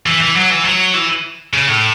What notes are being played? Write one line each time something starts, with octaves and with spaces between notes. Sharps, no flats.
E3
E3
F#3
E3
F#3
E3
C#3
A2